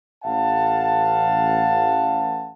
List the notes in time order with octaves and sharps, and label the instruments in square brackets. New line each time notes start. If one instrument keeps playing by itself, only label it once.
[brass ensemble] A1 F5 F#5 A5